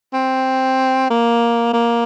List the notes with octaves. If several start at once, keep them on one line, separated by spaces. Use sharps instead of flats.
C4
A#3
A#3